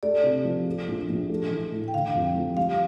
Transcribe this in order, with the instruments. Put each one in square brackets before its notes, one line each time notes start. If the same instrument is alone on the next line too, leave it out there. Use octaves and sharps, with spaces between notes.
[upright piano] A3 [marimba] D5
[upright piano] C3
F3
A3
A#1
A#1
A3
E3
A2
[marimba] G5
[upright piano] D3 [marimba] F5
[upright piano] F2
F3
[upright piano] G3 [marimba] F5